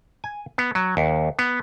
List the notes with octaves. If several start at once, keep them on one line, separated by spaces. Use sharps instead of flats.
G#5
B3
F#3
D#2
B3